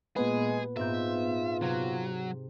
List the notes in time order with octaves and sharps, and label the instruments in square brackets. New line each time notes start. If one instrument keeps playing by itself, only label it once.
[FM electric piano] A#2 B3 B4 [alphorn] G#3 [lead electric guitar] G#4
[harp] G#2 C4 G6 [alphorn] F4 [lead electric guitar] E5
[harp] C3 [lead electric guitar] F#3